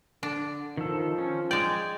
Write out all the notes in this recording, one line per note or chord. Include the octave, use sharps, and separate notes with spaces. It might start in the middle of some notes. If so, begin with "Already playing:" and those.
D3 D4
D#3 F3 A4
C#4
G#3 D5 G5 G#5